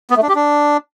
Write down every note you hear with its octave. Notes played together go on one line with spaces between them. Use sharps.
B3
A3
D4
G4
D4